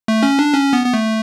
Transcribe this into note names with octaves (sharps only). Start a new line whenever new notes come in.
A3
C#4
D4
C#4
B3
B3
A3